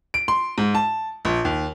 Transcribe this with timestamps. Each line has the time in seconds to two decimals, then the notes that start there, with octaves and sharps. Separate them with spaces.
0.14 D7
0.28 C6
0.58 G#2
0.75 A5
1.25 A#1
1.45 D#2